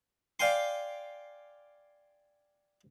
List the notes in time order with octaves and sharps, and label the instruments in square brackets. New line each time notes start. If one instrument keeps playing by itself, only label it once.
[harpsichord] D5 F5 G5 G#5 C6